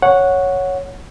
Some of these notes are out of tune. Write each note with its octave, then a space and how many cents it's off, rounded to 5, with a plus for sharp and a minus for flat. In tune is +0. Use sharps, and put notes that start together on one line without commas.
C#5 +0 F#5 -10